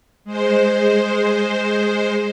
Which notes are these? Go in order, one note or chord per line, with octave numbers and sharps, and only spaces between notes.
G#3 C5